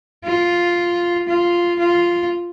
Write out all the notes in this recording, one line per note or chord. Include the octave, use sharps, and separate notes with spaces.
F4
F4
F4